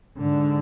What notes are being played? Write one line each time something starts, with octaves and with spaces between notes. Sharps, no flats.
G#2 D3